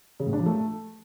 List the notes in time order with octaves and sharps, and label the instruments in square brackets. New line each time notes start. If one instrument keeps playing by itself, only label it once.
[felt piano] C#3
A2
D4
F3
A3